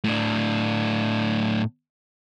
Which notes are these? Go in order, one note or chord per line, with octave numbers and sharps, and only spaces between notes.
A2 D4